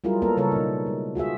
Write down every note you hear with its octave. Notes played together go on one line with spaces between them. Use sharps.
F#3 G3 E4 F4 G#4 A#4
A#3 B3 A4 A#4
C#3 G3 A4 A#4 C#5
B2 D#4
G#3
F4 F#4 G#4 E5